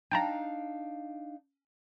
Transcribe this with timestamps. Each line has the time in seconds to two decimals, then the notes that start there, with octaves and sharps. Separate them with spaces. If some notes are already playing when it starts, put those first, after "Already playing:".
0.11 D4 D#4 F5 G5 A5 A#5